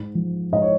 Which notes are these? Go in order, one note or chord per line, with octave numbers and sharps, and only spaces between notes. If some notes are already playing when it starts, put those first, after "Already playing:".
Already playing: G#2
F3
G#2 D#5
C#5